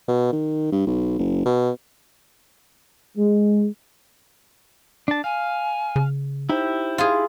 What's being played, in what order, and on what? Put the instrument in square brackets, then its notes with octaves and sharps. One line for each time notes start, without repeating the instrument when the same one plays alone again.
[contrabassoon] B2
D#3
G2
B1
F#1
B2
[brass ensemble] G#3
[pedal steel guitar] D4 A5
[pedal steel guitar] F5 [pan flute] G#5
[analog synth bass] C#3
[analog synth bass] D#4 [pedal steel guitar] E4 G4 [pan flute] C5
[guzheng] F4 G#4